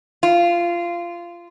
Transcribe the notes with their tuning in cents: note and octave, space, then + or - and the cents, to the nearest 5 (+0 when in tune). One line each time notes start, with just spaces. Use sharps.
F4 -15